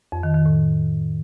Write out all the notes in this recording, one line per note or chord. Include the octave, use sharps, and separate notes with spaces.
F2
D#3
D#3
A2